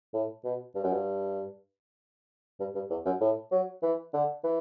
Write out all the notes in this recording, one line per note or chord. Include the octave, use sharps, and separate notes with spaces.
A2
B2
G2
F#2
G2
G2
G2
E2
F#2
A2
F#3
E3
D3
E3